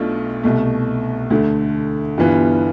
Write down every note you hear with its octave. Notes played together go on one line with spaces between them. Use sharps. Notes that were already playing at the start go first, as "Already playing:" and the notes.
Already playing: B1 B2 A3 D4 F4
C2 B2 A3
D2 D3 A3
G1 G2 E3 B3 F4